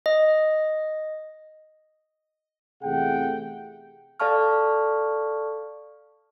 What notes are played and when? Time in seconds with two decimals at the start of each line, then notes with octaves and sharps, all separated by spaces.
0.06 D#5
2.82 E2 C3 A3 G#4 F#5 G5
4.20 A4 D5 F5 A5 C#6 F6